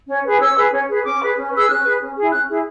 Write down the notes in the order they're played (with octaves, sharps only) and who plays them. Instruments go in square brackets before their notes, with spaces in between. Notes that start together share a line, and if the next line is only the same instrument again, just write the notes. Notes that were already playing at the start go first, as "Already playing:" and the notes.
[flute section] C#4
G#4 B4
C#4 E6
G#4 B4
C#4
G#4 B4
C#4 D6
G#4 B4
C#4
G#4 B4 E6
C#4 F#6
G#4 B4
C#4
E4 G#4
C#4 F#6
E4 G#4